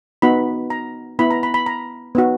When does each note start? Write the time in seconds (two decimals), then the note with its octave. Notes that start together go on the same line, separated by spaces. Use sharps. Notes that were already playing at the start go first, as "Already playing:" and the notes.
0.22 B3 D#4 F#4 B5
0.70 A#5
1.19 B3 E4 B5
1.31 A#5
1.43 B5
1.54 B5
1.66 A#5
2.15 B3 D#4 F#4